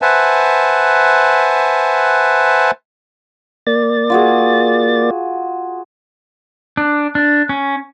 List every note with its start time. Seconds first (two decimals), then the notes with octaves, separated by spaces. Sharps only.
0.02 B4 C5 E5 F#5 G#5 A5
3.67 A#3 D5 A6
4.10 F4 F#4 G#4
6.77 D4
7.15 D4
7.49 C#4